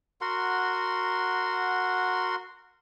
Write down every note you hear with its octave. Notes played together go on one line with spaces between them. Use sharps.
F#4 A#4 F#5 C6